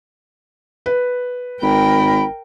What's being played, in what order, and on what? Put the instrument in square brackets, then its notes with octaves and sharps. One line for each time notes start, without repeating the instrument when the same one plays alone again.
[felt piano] B4
[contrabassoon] G#1 [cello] A#4 G5 [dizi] B5